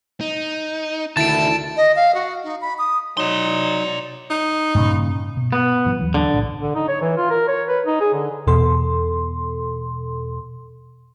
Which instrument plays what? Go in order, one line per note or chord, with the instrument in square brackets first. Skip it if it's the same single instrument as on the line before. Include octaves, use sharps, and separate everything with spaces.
[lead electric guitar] D#4
[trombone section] D2 E4 [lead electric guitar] D3 D#3 [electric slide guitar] A5 [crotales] A6 D7
[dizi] D#5
F5
F#4
D#4
B5
D#6
[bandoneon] F#3 D#4 [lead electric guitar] D5 C6
[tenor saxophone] D#4
[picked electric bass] G2 A#2 C#3
[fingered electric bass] B2
[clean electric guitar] B3
[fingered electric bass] G#2 F3 G3
D#2 E3 F#3
[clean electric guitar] D3
[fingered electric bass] B1 A2
[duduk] D3
D#4
C#5
E3
F4
A#4
C#5
B4
D#4
G#4
D3
[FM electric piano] E2 B2 A4 C6